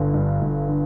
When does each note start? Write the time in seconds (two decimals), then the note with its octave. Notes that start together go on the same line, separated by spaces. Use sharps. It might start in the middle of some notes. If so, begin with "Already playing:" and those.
Already playing: G1 G2 D3
0.14 G2
0.42 G2
0.68 D3